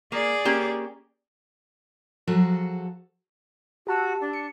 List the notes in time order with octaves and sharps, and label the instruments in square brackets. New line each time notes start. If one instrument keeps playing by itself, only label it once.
[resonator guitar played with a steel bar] A#3 [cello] G#4 D5
[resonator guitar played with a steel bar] A#3 C#4 G4
[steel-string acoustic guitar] F3 F#3 F#4 G#4 A4
[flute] F#4 [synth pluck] G4 A5 E6
[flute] D4
[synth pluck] C#7